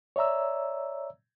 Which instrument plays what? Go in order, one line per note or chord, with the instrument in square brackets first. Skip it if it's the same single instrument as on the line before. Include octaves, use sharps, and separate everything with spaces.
[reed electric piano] C#5 D5 E5 A#5 E6